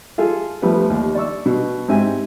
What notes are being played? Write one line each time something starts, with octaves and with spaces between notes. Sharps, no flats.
F4 G#4 A4
F3 G3 A3 B3 B4
D#2
D5 C#6 E6
B2
G#2 C4 G4 E5 G#5